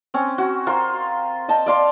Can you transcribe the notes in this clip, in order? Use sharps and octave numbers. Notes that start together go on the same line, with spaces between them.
C4 C#4
F#4
F4 A#4 C5
D#5 G5 A5
D5 F5 C6